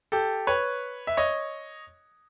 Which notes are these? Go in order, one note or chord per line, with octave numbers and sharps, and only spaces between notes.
G4 A4
B4 C#5
E5
C#5 D#5